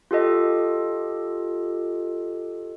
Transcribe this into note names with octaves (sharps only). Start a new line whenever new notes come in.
F4 G4 A4 D#5